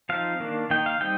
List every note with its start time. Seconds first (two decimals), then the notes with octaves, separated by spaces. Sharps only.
0.09 F3 C4 D#4 F5
0.40 D#3 A#3 D4
0.70 D#3 A#3 D#4 G5
0.86 F5
1.01 G3 C4 D#4 G5